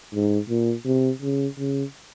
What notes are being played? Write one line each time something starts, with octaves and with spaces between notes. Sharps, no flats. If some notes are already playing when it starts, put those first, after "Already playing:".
G#2
A#2
C3
C#3
C#3